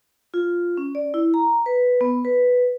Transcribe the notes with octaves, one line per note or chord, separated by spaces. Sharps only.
F4
C#4
D5
E4
A#5
B4
B3
B4